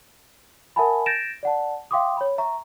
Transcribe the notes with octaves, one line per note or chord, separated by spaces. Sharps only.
A#4 E5 F#5 G#5 A5 B5
G6 A6 A#6 D7 E7
D5 F#5 A5
E5 F5 G5 C6 D6 D#6
C#5 B5
E5 A#5 C#6